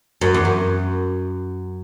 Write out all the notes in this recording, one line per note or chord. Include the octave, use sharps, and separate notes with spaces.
F#2
E2
F#2